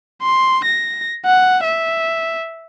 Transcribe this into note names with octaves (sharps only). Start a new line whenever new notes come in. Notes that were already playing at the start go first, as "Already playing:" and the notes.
C6
A#6
F#5
E5